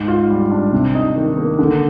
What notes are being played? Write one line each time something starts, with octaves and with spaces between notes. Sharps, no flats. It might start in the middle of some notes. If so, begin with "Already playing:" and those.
Already playing: G#2
F4
G3
D4
C3
D#4
D#3
A#3
D3